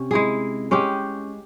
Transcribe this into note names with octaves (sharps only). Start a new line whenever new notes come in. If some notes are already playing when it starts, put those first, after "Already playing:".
Already playing: C3 C#4
G#3 E4 G#4
G#3 C#4 G4